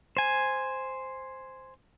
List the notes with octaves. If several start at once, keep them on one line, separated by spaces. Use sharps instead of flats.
C5 G#5